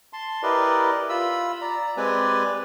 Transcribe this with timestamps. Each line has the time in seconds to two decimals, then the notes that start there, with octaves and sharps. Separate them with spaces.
0.13 A5 C6
0.43 E4 G4 A#4 B4 D5 D#5
1.09 F4 B5 E6
1.61 D5 A#5
1.97 G#3 C4 G4 B4 D5 G#5